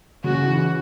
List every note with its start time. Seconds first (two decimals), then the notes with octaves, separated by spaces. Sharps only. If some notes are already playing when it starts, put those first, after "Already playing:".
0.24 C#3 F#4
0.46 E3